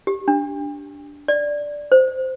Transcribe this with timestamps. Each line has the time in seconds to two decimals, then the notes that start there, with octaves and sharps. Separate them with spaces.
0.07 G4
0.28 D4
1.28 D5
1.92 C5